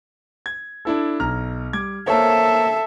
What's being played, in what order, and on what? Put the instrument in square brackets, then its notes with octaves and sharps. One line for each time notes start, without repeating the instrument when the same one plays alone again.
[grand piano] G#6
D4 E4 A4
B1 A#5 F6
G3 D6 G#6
[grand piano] A#3 C5 C#5 [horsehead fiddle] A4 E5